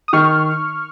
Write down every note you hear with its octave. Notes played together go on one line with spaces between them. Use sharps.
D#6
D#3 C#6 F6